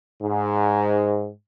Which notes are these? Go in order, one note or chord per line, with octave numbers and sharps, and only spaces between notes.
G#2